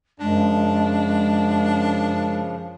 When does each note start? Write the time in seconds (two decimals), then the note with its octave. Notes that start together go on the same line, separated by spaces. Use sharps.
0.20 F#2 C#3 F3 G#3 D4